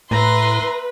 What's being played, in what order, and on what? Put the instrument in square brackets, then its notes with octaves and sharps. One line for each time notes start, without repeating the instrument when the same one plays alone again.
[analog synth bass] A2 [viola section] B4 [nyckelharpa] E5 A#5 [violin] C6